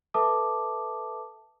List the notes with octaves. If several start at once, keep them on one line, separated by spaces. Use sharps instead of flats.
A4 B4 E5 A5 D6 D#6